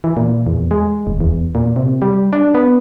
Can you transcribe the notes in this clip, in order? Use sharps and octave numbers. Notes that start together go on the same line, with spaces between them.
E3
A#2
E2
G#3
D#1
E2
A#2
C3
G3
D4
B3